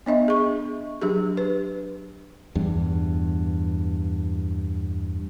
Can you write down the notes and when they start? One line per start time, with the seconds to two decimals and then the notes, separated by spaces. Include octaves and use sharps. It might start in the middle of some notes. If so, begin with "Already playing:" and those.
0.06 B3 D4 D#5 E5
0.28 G#4 C#6
1.02 F#3 D4 G4 G#4
1.37 B4
2.55 E2 G2